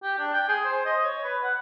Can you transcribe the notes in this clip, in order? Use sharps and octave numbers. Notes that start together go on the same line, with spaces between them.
G4
D4
G5
G#4
C5
D#5
C#5
B4
F#5